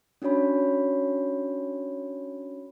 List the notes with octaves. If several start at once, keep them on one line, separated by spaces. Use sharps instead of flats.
C#4 D4 F#4 C#5 B5